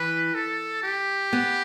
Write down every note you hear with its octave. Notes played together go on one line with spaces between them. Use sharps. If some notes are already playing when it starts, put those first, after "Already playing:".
Already playing: E3 B4
A4
G4
B3